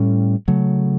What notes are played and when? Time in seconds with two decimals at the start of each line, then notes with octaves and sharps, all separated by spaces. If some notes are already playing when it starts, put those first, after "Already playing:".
Already playing: A2 G3 C#4
0.48 C#3 F#3 A3